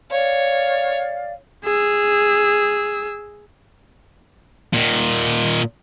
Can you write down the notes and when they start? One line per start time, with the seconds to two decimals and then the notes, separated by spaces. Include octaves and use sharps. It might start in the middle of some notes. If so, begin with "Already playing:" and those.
0.11 C#5 D5 F5
1.64 G#4 E6
4.73 A#2 D#3